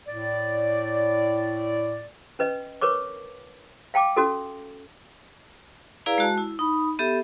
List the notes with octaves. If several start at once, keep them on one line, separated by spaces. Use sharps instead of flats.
A2 D5
C#4 B4 D#5
A#4 B4 C#5 C#6 D6
F5 G5 A5 D6
C#4 F#4 A4
E4 G#4 B4 D5 F5 A#5
G#3 F#4 A5
E4
D#4 B5
B3 G4 A4 E5